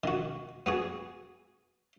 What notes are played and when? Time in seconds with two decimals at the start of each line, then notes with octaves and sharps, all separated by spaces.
0.04 D#3 F#4
0.66 B3 F#4 G#4